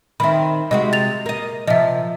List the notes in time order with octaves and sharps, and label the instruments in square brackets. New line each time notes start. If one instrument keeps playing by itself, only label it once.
[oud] D#3 C4 [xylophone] E5 B5
[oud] C3 G#3 F#4 [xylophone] D#5
[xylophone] A6 F7
[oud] A#3 D#5
[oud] C3 F3 [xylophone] D#5 E5